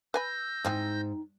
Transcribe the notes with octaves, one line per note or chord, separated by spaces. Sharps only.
B4 G#5 B5 E6 G6 A#6
G#2 G#3 C4 D#4 E4